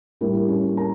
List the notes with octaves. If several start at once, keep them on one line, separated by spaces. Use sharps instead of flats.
A2 G3 A#3 A#4
A#3 A#4
C#4 C#5
A#4 A#5